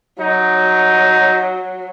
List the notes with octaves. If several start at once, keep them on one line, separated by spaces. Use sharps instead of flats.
F#3 D#4